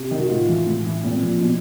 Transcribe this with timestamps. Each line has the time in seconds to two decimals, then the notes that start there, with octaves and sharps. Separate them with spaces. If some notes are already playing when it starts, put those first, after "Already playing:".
Already playing: C3
0.11 D#3
0.20 F#4
0.29 A2 F4
0.49 E3
0.66 A2
0.85 E3
1.04 A#2 C4
1.21 F3
1.41 B2